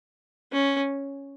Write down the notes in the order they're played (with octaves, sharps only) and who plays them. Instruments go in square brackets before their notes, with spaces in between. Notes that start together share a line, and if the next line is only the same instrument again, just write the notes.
[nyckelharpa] C#4